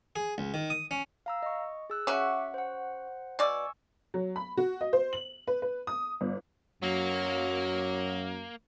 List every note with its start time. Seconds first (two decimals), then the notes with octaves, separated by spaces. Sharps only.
0.16 G#4
0.38 C#2
0.54 D#3
0.70 D#6
0.91 C#4
1.26 F5 A#5 E6
1.43 D#5 C#6
1.90 G#4 E6 F#6
2.07 C#4 F#4 E5 F#5 D6
2.54 C5 F#5
3.39 B2 D5 G#5 C#6 E6
4.14 F#3
4.36 B5
4.57 F#4
4.81 D#5
4.93 C5
5.13 F#7
5.47 B4
5.62 B4
5.87 D#6
6.21 G1
6.83 F#2 F#3 A#3